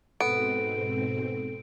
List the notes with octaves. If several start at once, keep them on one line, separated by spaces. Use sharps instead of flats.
G#2 B2 B3 C4 A4 D7